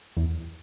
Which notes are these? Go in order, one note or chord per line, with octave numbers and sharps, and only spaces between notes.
E2